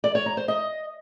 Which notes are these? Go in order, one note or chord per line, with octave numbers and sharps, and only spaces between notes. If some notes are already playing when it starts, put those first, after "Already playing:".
D5
C#5
A#5
C5
D#5